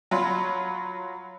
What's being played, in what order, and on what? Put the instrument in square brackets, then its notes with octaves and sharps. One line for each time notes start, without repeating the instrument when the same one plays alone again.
[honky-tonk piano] F#3 F4 B5